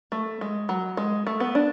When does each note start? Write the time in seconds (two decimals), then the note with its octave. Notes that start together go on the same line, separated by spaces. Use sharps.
0.12 A3
0.41 G#3
0.69 F#3
0.97 G#3
1.27 A3
1.40 B3
1.55 D4